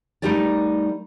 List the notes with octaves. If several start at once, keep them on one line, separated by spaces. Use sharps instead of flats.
G3 A3 D#4 G4 A#4 D5